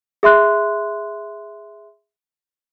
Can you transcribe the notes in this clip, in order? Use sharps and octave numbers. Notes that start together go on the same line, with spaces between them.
G#4 E5 C6 F#6